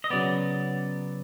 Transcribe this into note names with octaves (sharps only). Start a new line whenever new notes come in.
D#5
C#3 F#3 B3 D5